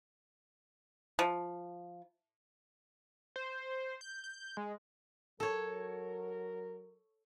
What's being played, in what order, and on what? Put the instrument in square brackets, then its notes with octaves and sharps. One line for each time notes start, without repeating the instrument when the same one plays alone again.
[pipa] F3
[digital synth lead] C5
G6
G6
G#3
[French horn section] F#3 A#4 [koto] A4 C#5